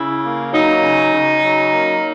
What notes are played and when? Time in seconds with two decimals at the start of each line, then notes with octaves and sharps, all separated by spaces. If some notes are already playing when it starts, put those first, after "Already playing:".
Already playing: C#3 E4
0.23 A#3
0.52 F#3 D#4
0.82 C#3
1.12 C#3
1.42 F#3
1.70 A#3